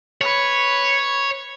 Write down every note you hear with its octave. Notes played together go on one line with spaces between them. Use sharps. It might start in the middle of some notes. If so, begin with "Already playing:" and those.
B4 C#5